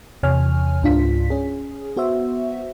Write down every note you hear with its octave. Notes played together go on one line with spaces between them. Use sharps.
E2 C3 C#5 G#5 F6
C#2 G#2 D4 F4 B6
C#4 G#4
B3 F#4 C5 E5